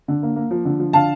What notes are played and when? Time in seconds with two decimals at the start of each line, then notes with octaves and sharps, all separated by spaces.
0.08 D3
0.23 A#3
0.36 A#3
0.51 F3
0.65 D3
0.79 F3
0.93 D3 F5 A5